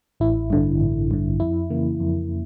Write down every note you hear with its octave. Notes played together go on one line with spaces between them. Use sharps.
A1 E4
G2 D3
A1
G2 D3
F2 E4
C#3 E3 A#3
F2